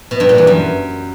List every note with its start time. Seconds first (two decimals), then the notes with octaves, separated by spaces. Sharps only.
0.11 B2
0.20 G2
0.29 A#2
0.38 E2
0.47 F#2